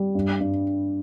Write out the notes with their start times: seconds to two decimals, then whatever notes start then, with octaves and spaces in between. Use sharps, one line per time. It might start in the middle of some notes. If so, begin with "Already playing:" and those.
Already playing: G3
0.15 G2
0.40 G2